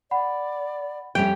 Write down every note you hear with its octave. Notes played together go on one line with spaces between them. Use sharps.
D5 F#5 B5
F2 G3 C#4 G5